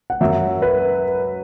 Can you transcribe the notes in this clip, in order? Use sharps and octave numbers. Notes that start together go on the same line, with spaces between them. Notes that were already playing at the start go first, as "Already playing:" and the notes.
F#5
F#2 F#3 E5
B4